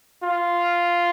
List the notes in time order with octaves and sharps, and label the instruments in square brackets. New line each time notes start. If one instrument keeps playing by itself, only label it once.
[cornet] F4